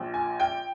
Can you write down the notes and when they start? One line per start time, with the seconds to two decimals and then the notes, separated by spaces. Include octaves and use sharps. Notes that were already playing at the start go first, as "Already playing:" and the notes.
Already playing: A#1 A#2
0.14 G#5
0.40 G5